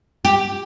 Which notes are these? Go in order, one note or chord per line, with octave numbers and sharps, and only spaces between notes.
G4